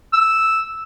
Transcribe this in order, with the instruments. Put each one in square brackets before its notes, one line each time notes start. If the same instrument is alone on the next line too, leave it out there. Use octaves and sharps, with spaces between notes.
[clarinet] E6